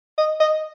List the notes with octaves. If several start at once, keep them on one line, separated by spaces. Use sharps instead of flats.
D#5
D#5